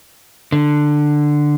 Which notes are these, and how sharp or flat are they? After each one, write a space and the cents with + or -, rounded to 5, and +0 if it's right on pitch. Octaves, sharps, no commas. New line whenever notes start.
D3 +10